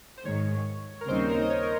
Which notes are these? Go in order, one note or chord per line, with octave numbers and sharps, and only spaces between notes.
C5
G#2 D#3 G#3 C#5
A#4
D#2 C#3 G3 C4 D#4 C5
A#4
D#5
C#5
A#4